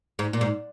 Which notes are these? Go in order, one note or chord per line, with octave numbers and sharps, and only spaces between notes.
G#2
A#2
G#2